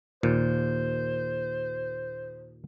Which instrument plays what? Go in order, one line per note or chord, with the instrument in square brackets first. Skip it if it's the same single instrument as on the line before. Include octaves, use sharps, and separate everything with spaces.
[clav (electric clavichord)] D#2 A#2 [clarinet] C5